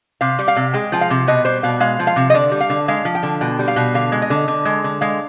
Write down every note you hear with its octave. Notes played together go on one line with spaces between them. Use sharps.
C3 F5
G3
F5
C3
G#3 G5
F3 G5
F5
C3
B2 D#5
G3 C5
B2 F5
G#3 F5
F3
F5
C3
D#5
D3 D5
G3
F5
D3
G#3 F5
F3
G5
D3
B2 G5
G3
F5
B2
D3 F5
G#3
D#5
D3
D3
G#3
D3
G#3 F5